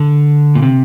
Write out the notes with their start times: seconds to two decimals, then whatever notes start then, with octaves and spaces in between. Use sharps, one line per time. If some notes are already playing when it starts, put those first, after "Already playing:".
Already playing: D3
0.55 A#2
0.62 C3